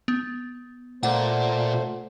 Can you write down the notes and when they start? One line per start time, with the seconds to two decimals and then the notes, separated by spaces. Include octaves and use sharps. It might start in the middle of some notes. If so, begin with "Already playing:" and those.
0.08 B3
1.03 A#2 A3 C5 F#5